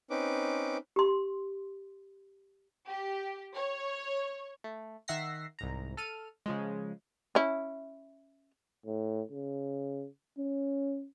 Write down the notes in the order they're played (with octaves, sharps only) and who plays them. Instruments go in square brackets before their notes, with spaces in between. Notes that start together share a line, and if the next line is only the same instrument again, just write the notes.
[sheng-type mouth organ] C4 C#4 D#4 B4 D6
[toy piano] G4 C6
[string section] G4
C#5
[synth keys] A3
D#3 E5 F#5 A#6 C7
C2 G#2 A#5
A4 F6 D#7
C#3 F3 G#3
[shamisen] C#4 E4
[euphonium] A2
C#3
C#4